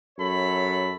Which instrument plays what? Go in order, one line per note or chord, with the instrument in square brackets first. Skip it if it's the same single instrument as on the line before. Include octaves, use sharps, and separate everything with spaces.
[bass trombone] F#2 [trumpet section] A4 C#5 B5